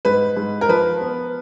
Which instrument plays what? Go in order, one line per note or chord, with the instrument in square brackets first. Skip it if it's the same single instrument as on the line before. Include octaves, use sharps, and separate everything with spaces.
[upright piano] G#2 B4
G#2
A#4
F3 B4
B3